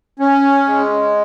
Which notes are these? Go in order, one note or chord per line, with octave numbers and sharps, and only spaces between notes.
C#4
G#3